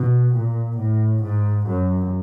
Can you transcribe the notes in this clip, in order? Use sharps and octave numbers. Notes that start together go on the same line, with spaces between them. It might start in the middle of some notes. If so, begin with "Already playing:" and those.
Already playing: B2
A#2
A2
G#2
F#2